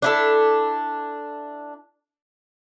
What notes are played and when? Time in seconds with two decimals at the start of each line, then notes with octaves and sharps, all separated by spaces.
0.02 D4 E4 A4